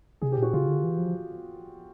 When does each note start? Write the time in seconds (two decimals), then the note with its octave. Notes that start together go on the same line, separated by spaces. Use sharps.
0.22 C3 G#4
0.32 G4
0.38 A#2 F#4
0.53 C#3 F4
0.68 D3
0.84 E3
0.98 F3